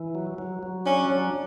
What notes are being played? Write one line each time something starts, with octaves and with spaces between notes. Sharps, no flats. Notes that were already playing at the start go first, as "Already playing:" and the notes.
Already playing: E3
F#3
F#3
F#3
C#4 D4
F#3